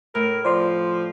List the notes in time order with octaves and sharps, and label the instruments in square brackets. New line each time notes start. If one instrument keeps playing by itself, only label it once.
[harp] A2 [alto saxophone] A#4
[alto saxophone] F3 [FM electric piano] C5 D5 C6